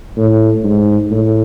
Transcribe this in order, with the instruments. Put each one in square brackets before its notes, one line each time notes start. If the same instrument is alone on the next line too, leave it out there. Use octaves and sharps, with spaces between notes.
[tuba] A2
G#2
A2